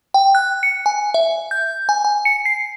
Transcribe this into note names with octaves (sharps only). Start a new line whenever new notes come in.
G5
F#6
C#7
G#5
E5
G6
G#5
G#5
C#7
C7